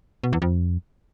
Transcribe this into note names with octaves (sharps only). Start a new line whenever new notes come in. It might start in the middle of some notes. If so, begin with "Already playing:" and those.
B2
E2
F2